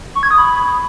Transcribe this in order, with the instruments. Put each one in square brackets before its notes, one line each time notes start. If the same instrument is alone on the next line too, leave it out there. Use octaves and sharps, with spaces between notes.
[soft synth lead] C#6
G#6
D#6
B5